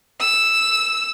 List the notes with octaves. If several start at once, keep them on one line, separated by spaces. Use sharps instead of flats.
E6